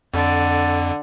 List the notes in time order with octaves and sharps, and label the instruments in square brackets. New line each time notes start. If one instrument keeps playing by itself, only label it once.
[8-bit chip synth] F2 [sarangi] D3